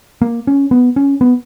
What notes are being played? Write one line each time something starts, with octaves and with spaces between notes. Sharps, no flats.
A#3
C#4
B3
C#4
B3